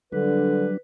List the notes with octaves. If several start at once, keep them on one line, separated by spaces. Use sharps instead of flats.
D3 F#3 G3 D4 B4